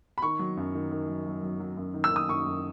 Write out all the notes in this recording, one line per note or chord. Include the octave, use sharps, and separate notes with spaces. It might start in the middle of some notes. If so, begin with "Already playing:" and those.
B5
D#3 C#6
F#3
F#2
D#3
D#3
F#3
F#3
F#3
F#3
F#2
D#3
E6
D#3 D#6
F#2 C#6
F#2